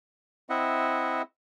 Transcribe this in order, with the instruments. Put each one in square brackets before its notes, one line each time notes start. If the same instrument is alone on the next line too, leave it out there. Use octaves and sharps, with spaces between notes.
[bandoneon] C4 E4 D#5 E5 F#5